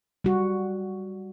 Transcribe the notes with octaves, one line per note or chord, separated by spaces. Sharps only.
G3 F#4